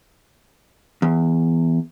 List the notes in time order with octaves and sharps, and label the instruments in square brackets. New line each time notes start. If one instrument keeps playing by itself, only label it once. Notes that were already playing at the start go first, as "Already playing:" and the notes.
[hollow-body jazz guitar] E2